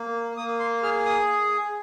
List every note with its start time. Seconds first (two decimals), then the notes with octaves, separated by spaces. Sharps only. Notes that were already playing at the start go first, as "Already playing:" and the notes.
Already playing: A#3
0.37 A#3 D#6
0.60 C6
0.83 G#4 F6
1.06 D#6